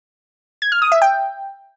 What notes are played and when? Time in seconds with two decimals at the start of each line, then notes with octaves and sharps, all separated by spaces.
0.62 G#6
0.72 F6
0.82 D#6
0.92 E5
1.02 G5